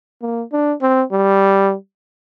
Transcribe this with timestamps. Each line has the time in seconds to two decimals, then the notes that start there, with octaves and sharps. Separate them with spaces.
0.22 A#3
0.53 D4
0.82 C4
1.12 G3